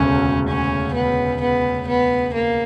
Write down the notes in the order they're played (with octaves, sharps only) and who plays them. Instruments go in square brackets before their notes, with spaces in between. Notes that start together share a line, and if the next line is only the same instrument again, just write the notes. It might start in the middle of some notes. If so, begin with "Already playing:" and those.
Already playing: [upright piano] E1 D2 C#3 [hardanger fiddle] C#4
[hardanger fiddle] C#4
B3
B3
B3
A#3